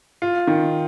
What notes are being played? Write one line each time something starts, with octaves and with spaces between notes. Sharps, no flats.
F4
D#3